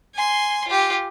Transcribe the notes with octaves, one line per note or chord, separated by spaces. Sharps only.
G#5 C6
F4 G4